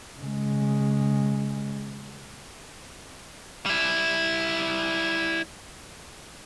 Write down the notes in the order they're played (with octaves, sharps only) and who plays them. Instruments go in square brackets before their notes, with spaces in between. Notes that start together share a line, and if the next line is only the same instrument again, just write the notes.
[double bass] C#3 G#3
[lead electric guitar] G3 E4